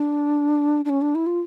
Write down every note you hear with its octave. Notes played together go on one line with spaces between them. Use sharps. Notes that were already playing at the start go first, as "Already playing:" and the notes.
Already playing: D4
D4
C#4
D4
E4
F4